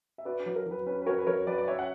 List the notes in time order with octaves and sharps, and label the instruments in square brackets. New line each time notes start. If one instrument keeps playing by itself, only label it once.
[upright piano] E5
[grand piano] F#4 [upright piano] B4 D5
[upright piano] B4
[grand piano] F#3
[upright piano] A#4
[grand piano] F#3 [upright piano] B4
[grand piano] C#4 [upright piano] B4
[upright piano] B4
[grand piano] F#4 [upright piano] A#4 C#5
[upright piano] B4
[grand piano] F#3 [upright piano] A#4 C#5
[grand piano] F#3 [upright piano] B4 D5
[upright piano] D5
[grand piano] C#4 [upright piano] C#5 E5
[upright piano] F#5